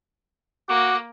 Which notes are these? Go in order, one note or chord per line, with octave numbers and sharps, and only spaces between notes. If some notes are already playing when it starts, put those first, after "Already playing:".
A#3 F#4 D6